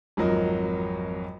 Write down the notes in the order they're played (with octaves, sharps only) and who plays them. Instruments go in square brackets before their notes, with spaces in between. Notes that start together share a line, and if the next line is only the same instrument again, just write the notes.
[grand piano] G#1 F2 F#3 A#4 D#5